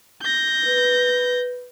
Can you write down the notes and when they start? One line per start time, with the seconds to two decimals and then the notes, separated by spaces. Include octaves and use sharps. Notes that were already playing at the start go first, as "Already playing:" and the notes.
0.22 G6 A#6
0.64 B4